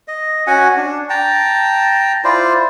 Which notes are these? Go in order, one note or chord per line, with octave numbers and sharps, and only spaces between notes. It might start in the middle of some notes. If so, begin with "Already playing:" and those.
D#5
C#4 F#4 F#5 G#5
D4
G5 A5 A#5
E4 F4 C5 D5